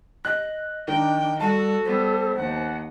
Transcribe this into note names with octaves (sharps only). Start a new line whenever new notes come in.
D#5 F#6
D#3 D4 G5
G3 F#4 A4 A5
G3 B3 C5
D#2 F#5